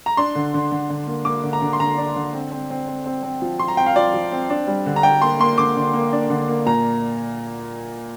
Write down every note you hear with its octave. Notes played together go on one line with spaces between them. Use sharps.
A#5
D4 C6
D3
D3
D3
D3
A#3
A#3 D6
D3
A#5
D3
C6
D3 A#5
D4
D3
C4
C4
C4
C4
C4
C4
F3
F3 C6
A#5
C4 G5
F5
F3 D5
F3
C4
D4
G3
D3
A#5
D4 G5
A#3 C6
A#3 C6
D3 D6
D3
A#3
D4
D3
A#3
A#2 A#5